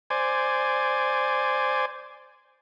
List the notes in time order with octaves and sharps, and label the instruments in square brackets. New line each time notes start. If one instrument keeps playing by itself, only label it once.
[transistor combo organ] C5 D5 G#5